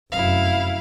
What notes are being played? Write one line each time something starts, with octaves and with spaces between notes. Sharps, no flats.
F1 F#2 E4 F5